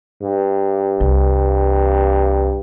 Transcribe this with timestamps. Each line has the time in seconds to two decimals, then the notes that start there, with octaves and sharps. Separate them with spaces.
0.23 G2
1.00 C2